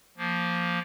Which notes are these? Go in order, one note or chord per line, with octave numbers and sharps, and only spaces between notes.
F3 A#3